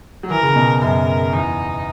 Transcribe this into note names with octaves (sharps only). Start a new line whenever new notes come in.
F#3
E3 A#4
C#3
B2
F#2 A#4
E2 D#4